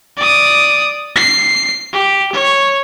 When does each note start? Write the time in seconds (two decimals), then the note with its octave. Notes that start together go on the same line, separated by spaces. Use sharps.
0.17 D5 D#6
1.16 C7
1.93 G4
2.33 C#5